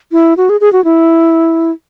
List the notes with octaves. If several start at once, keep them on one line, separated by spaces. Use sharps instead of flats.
E4
F#4
G#4
G#4
F#4
E4